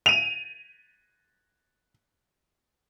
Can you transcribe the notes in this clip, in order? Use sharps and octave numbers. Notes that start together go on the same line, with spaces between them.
D#7 F7